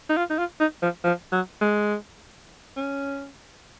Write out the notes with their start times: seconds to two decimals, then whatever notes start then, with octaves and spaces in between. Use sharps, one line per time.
0.09 D#4
0.17 F4
0.30 D#4
0.38 F4
0.59 D#4
0.82 F3
1.04 F3
1.32 F#3
1.61 G#3
2.76 C#4